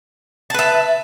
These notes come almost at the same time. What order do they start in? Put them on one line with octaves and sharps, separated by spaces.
A5 B4 E5